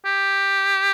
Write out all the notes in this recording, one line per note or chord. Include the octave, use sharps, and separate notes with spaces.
G4